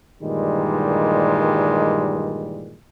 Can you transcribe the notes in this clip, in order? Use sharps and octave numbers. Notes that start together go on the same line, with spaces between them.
G2 A#2 D#3 E3 G3 G#3